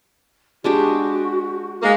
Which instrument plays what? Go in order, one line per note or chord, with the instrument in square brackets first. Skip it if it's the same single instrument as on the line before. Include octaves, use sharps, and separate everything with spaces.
[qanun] G#3 D4 G4 [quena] F#4
[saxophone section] G#3 A#3